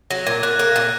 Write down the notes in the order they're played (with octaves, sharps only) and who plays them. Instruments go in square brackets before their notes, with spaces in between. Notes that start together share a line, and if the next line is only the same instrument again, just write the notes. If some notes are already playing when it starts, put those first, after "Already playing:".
[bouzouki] F#3 [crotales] A#6
[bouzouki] A#2 [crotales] G#6
[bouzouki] A#2 [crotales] F#6
[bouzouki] A#3
A#2